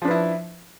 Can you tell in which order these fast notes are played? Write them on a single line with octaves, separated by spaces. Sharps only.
F3 D4 B4 E4